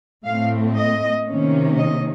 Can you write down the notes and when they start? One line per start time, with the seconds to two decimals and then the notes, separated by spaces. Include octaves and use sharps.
0.25 A2 A3 C4 F5
0.76 D#5
1.27 C3 D#3 A#3 C#4
1.78 D#5